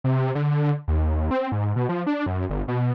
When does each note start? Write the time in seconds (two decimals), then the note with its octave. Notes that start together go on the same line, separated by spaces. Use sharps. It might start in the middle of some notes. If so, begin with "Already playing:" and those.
0.04 C3
0.35 D3
0.88 D#2
1.31 C4
1.52 G#2
1.76 B2
1.89 F3
2.07 D4
2.26 F#2
2.49 G1
2.68 B2